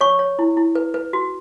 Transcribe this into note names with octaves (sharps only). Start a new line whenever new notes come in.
C#5 C#6
C#5
E4
E4
B4
B4
F#4